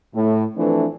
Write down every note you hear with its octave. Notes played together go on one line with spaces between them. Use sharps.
A2
E3 F3 A3 C4 D4 B4